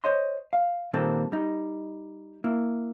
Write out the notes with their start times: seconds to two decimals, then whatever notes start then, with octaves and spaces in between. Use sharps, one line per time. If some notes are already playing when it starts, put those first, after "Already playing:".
0.04 C5 C#5 D#5 C6
0.53 F5
0.93 A#2 D#3 G3 A#3 C4 A4
1.32 G3 D#4
2.44 A#3 E4